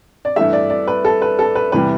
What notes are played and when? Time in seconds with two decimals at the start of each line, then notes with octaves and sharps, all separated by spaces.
0.25 D5
0.36 G2 E3 A3 E5
0.53 D5
0.70 D5
0.88 B4
1.05 A4
1.22 B4
1.39 A4
1.55 B4
1.72 E2 C3 E3 G3 B4